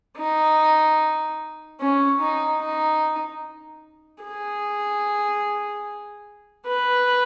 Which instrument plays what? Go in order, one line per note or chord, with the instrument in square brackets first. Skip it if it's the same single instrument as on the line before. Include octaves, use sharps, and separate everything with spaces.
[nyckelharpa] D#4
C#4
D#4
D#4
G#4
B4